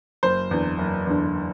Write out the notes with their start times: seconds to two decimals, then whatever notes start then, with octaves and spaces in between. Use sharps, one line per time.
0.23 F#1 C5
0.51 E2 D3
0.79 F#1
1.07 E2 D3